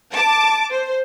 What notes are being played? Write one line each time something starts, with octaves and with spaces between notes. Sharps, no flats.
A5 D6
C5